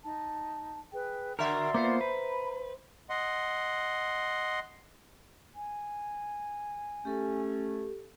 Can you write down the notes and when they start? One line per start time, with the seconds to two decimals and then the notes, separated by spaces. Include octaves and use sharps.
0.03 D#4 A5
0.93 G#4 B4 G5
1.39 D3 F#4 A#4 D5 E5 C6
1.74 A#3 B3 F4 C5
2.01 B4 A#5 B5
3.10 D#5 F#5 C6
5.55 G#5
7.05 A3 C#4 G4 A4